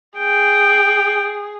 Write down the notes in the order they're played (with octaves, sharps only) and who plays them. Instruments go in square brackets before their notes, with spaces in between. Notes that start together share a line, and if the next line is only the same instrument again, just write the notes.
[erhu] G#4 [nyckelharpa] G5